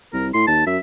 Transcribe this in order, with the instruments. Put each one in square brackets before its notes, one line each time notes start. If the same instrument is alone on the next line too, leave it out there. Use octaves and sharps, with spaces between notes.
[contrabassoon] C2 [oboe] A#4
[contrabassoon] A2 [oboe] C6
[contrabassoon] D#2 [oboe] A5
[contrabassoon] F#2 [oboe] E5